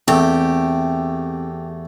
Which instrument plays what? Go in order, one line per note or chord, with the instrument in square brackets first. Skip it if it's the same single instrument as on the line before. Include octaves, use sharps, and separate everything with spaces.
[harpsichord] E2 A3 [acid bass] C4 [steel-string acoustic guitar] G4